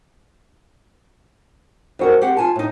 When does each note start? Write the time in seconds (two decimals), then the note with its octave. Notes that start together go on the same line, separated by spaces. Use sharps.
1.99 F2 F#4 A#4
2.22 C4 G4 F#5
2.37 F4 G#5 A5
2.56 A2 D#4